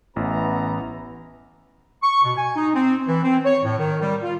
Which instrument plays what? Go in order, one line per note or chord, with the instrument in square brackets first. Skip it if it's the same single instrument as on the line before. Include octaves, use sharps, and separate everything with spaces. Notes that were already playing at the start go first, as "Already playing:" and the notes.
[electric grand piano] A1 [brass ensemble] E3 B3 A#5
[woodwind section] C#6
B2
G#5
D#4
C4
E3
C4
C#5
A2
D#3
G3
F4